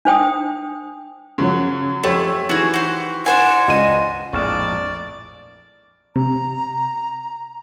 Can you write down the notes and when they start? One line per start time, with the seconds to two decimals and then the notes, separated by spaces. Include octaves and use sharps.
0.05 D4 C5 G5 D#6
1.38 F#2 C#3 F3 F#3
2.04 F2 A3 C#4 G4 C#5
2.49 D#3 E3 F#4 G#4
2.74 F#4 C5
3.26 D4 C5 F#5 G#5
3.68 C#2 D#5 D#7
4.33 A#1 F2 A2 G#3 D5 C#6 F6 E7
6.16 C3 A#5